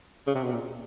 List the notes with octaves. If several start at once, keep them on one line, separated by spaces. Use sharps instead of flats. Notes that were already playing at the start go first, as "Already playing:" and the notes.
C#3
C3
B2
A#2